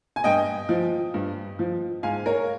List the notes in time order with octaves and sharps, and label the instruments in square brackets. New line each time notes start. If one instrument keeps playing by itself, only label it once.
[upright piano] G#5
G2 D#5 G5
F3
G2
F3
G#2 F5 G#5
A#4 C#5